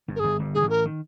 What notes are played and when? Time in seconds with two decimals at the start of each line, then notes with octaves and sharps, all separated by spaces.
0.08 G1 G2
0.16 A#4
0.20 G1 G2 G#4
0.39 G1 G2
0.55 G#2 G#4
0.62 A1 A2
0.70 A#4
0.85 D#3